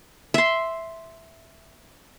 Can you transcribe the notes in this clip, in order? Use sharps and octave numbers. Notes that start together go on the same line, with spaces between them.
E5 C6